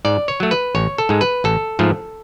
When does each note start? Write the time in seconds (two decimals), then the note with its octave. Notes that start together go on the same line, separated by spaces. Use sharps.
0.05 G#2 D5
0.28 C#5
0.40 F#3 A3
0.51 B4
0.75 A1 C#5
0.98 A4
1.09 G#2 G#3
1.21 B4
1.44 A1 A4
1.79 G#2 F3 A3